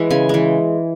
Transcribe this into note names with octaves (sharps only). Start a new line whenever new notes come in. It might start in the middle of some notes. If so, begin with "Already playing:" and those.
Already playing: E3 G#3 B4 E5
C#3 G#5
E3 G#3